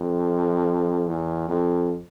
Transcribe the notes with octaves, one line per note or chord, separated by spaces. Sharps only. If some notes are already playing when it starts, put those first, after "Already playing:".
Already playing: F2
E2
F2